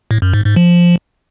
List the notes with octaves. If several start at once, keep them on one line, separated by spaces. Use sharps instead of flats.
A2
F#2
G#2
G#2
F3